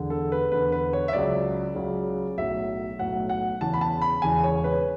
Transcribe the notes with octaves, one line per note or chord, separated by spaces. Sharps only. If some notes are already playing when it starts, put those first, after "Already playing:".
Already playing: E1 E2 D3
A4
B4
E1 E2 D3 B4
B4
C#5
E5
C#2 C#3 F#3 D5
C#2 C#3 F#3
B1 A2 F#3 E5
B1 A2 F#3 F#5
F#5
E1 E2 C#3 E3 A5
B5
A5
B5
E1 E2 C#3 E3 G#5
C#5
B4